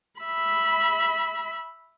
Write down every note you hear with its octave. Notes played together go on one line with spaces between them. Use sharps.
E5 B5